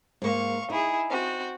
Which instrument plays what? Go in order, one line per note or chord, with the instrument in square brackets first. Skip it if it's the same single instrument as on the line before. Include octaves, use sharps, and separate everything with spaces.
[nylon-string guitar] G#2 A#3 [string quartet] F5 C#6
[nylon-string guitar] D#4 [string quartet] E4 G#4
[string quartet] C4 F#4